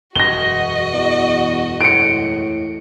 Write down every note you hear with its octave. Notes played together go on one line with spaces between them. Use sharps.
E1 F#2 F#4 D#5 A#6 G7
E2
A2 C#7 D7